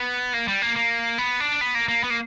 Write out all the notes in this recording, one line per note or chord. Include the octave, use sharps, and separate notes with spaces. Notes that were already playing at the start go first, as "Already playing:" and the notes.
Already playing: B3
A#3
G3
A#3
A#3
B3
D4
B3
A#3
A#3
B3
A#3